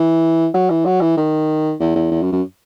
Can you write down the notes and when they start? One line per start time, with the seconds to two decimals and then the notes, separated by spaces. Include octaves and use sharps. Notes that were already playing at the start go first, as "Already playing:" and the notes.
Already playing: E3
0.54 F#3
0.70 E3
0.86 F#3
1.01 E3
1.17 D#3
1.80 E2
1.96 E2
2.12 E2
2.22 F#2
2.33 F#2